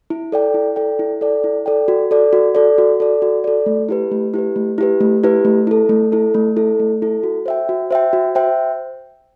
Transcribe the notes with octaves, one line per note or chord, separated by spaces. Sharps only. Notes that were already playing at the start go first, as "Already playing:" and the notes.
E4
A4 D5 G5
E4
A4 D5 G5
E4
A4 D5 G5
E4
A4 D5 G5
F#4
A4 D5
F#4
A4 D5
F#4
A4 D5
F#4
A4 D5
A3
E4 G4 B4
A3
E4 G4 B4
A3
E4 G4 B4
A3
E4 G4 B4
A3
E4 A4
A3
E4 A4
A3
E4 A4
A3
E4 A4
F#4
C5 E5 G5
F#4
C5 E5 G5
F#4
C5 E5 G5